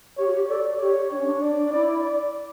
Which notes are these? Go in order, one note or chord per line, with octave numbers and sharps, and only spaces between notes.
G4 C#5
F#4
G4
A4 D5
G4 C#5
D4 C#5
C#4
D4
D4 D5
D4
E4 D5
D5